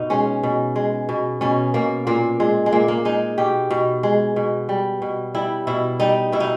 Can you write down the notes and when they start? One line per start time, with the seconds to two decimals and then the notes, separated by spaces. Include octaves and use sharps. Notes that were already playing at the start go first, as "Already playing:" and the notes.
Already playing: B2 D#4
0.10 G#3 C#4
0.43 B2
0.76 G#3
1.09 B2
1.41 B2 C#4
1.74 B2 A#3
2.07 A#2 A#3
2.40 A#2 G#3
2.66 G#3
2.72 A#2 A#3
2.88 A#3
3.05 G#3 D#4
3.38 B2 G4
3.71 B2
4.03 G#3
4.36 B2
4.69 G3
5.02 B2
5.34 G3 E4
5.67 B2 E4
6.00 G3 D#4
6.32 B2 E4
6.40 D#4